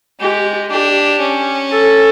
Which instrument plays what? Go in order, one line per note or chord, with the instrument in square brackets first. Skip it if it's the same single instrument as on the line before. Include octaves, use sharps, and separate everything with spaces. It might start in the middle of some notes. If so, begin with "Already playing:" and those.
[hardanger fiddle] G#3 [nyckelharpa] G4
[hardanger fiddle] D4 [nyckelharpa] G4
[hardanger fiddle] C#4
[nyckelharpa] A4